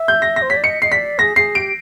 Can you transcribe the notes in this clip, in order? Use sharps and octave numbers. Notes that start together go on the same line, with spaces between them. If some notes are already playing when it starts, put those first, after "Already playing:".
Already playing: E5
G6
A#6
A#6
C5
C#5 B6
D5
D#5 C#7
D#5 C7
D5 B6
G#4 A#6
G#4 C7
G4 D7